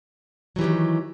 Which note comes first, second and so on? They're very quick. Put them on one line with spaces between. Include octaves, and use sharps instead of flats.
F#3 E3 G4 D#3